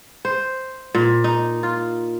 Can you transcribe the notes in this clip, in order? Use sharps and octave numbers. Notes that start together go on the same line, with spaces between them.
C5
A#2
D#4
F4